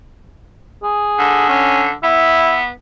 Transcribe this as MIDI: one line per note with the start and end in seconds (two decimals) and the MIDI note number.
0.83 1.48 68
1.19 1.92 50
1.49 1.85 61
2.03 2.69 59
2.03 2.57 64